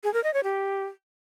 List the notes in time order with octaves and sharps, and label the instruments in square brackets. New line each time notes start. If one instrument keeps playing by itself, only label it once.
[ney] G#4
A#4
D#5
C#5
G4